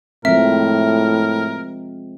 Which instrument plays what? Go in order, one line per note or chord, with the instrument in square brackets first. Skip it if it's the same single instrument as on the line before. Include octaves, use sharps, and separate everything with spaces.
[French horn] A2 [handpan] F3 G#3 C4 [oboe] A#4 [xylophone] E5